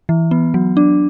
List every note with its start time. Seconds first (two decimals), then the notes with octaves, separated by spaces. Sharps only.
0.09 E3
0.31 B3
0.54 F#3
0.77 D4